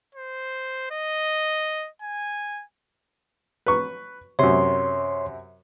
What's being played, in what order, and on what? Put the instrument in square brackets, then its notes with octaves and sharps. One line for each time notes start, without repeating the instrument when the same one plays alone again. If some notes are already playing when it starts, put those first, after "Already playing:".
[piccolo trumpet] C5
D#5
G#5
[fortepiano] B4 C#6
[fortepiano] F#2 C3 [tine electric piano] C#5 C6